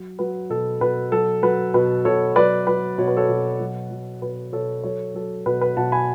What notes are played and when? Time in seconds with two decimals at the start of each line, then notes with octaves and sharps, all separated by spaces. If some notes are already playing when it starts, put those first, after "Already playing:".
Already playing: F#3
0.19 F#3 B4
0.50 B2 A4
0.81 B2 B4
1.12 F#3 A4
1.43 F#3 B4
1.74 B2 B4
2.05 B2 A4 C#5
2.36 F#3 B4 D5
2.67 F#3 B4
2.98 B2 C#5
3.08 B4
3.17 A4 C#5
3.29 B2
3.60 F#3
3.91 F#3
4.22 B2 B4
4.52 B2 A4 C#5
4.84 F#3 A4 C#5
5.14 F#3 A4
5.46 B2 B4
5.61 B4
5.77 B2 F#5 A5
5.92 G#5 B5